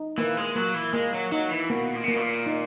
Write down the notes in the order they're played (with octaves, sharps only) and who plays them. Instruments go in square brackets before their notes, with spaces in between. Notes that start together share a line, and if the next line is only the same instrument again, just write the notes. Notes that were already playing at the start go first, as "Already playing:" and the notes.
Already playing: [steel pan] D#4
[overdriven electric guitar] E3 [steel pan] A#3
[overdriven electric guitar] G#3
[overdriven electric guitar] F#3 [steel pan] A#3
[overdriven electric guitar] E3
[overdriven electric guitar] G#3 [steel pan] A#3
[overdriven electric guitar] F#3
[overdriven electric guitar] F#3 [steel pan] D#4
[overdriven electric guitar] E3
[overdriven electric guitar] B2 [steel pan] A#3
[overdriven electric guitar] A#2
B2
[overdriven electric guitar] A#2 [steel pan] A#3
[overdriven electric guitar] B2
A#2
[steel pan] D#4